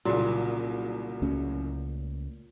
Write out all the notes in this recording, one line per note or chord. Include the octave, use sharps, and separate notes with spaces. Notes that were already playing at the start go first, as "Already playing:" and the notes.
C2 A#2 C#3 F#3
C#2 A3 C#4